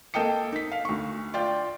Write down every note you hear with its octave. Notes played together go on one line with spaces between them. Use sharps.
A#3 A4 D#5 G5 D#6 C#7
D#4 B6
F5
D2 C#6
F4 D5 G5